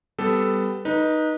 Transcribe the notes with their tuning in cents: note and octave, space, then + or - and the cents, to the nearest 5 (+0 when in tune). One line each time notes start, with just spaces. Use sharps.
G3 +0 B3 +15 A4 +0
D#4 +0 B4 -25